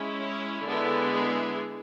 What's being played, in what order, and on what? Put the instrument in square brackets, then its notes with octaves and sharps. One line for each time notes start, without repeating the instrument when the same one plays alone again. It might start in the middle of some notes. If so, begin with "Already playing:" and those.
Already playing: [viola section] G#3 C#4 E4
C#5
D3 G#3 B3 E4 A4
G#4